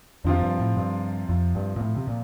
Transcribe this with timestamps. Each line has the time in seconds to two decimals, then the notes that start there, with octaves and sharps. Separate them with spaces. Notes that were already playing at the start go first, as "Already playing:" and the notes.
0.24 F2 C3 F3 C4 F4
0.41 G2
0.59 A2
0.76 G2
1.29 F2
1.55 G2
1.76 A#2
1.81 A2
1.96 C3
2.07 A#2